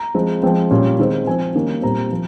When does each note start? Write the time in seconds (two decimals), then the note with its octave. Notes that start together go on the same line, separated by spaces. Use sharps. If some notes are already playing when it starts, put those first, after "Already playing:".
Already playing: A#5
0.14 F3 G#3 C4
0.43 F3 G#3 C4 G5
0.71 A#2 G3 A#3 C#4
0.99 D#3 G#3 C4
1.27 F3 C4 G#5
1.55 D#3 G3 A#3 C#4
1.82 A#2 G3 C4 A#5
2.11 F3